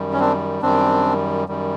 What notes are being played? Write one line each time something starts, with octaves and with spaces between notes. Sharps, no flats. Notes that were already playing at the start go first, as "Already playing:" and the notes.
Already playing: F#2 D#3 G3
C#4
C4 D4
F#2 D#3 G3 C4 D4
F#2 D#3 G3